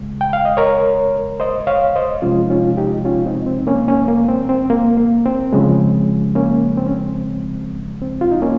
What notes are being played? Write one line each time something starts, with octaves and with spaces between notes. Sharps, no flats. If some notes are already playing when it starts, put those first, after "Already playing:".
Already playing: C#3 G#3
G5
F5
D#5
A#4 C#5
C5 D#5
C#5 F5
C5 D#5
C3 F3 G#3 C#4 F4
D#4
C#4 F4
D#4 G4
C#4 F4
C4 D#4
C4
A#3 C#4
A#3 C#4
A#3
C4
C4
A#3
A#3
C4
C#3 F3 G#3
A#3 C#4
C4
C#4
C4
C4
F4
D#4
A#3 C#4